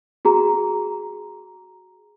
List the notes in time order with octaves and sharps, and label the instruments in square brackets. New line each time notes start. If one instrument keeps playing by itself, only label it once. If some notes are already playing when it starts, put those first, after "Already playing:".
[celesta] F#4 G#4 A#5